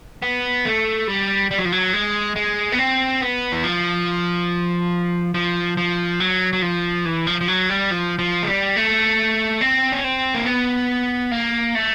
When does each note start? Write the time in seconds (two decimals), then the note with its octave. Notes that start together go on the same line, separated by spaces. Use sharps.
0.22 B3
0.65 A3
1.08 G3
1.51 G3
1.59 F#3
1.65 F3
1.72 F#3
1.93 G#3
2.36 G#3
2.72 B3
2.79 C4
3.21 B3
3.52 E3
3.64 F3
5.34 F3
5.77 F3
6.20 F#3
6.53 F#3
6.62 F3
7.05 E3
7.27 F3
7.41 F3
7.48 F#3
7.69 G3
7.91 F3
8.19 F3
8.43 G#3
8.47 G3
8.76 A3
9.61 C4
9.92 C#4
10.04 C4
10.35 A#3
10.46 B3
11.31 A#3
11.75 A3